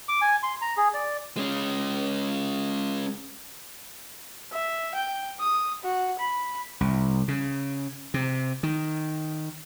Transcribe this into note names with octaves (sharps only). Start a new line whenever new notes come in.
D6
G#5
C6
A#5
G#4
D5
G#3 C#4
E5
G5
D#6
F#4
B5
C2
C#3
C3
D#3